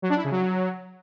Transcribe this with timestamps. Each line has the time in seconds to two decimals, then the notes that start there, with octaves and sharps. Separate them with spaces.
0.02 F#3
0.10 D4
0.17 E4
0.24 C#3
0.31 F#3